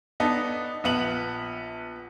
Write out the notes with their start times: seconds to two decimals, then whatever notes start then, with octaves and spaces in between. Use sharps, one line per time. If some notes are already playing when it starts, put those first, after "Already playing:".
0.20 B3 D4 D#4 A4
0.84 A#1 B3 F#7